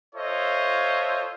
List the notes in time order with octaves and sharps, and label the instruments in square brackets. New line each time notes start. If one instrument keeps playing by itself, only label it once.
[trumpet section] F4 A4 C5 C#5 D#5 E5